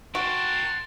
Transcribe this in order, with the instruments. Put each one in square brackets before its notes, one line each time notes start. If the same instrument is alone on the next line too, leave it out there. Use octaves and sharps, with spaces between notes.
[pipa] F#4 [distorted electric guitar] G4 A#4 [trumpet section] F#5 A5 C6